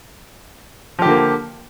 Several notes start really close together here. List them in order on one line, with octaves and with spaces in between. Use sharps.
F3 G4 D3 A#3